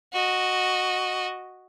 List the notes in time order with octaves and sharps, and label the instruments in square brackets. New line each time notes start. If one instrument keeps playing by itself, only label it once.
[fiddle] F#4 D#5